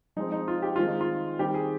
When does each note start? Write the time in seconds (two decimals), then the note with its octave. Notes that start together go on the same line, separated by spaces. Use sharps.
0.16 F3 G#3 C4 D#4
0.32 D#4
0.48 F4
0.62 G4
0.76 D#3 G#3 C4 F4
0.88 D#4
1.01 F4
1.39 D#3 G3 C4 G4
1.54 G#4